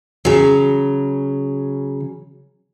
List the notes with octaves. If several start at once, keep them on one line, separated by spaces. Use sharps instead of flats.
C#3 F#3